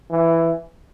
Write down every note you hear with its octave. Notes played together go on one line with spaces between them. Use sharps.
E3